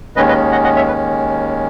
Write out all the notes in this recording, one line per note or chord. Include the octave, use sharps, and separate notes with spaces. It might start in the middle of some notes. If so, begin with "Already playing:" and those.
D#2 D#3 G#3 C#4 B4 D#5
B4 D#5
D#5 F#5
D#5 F#5
C#5 E5
B4